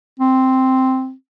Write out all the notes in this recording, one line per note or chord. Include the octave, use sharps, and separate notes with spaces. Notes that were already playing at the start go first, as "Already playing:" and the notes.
C4